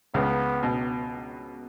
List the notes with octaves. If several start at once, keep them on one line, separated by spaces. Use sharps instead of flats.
C#2 C#3 B3
B2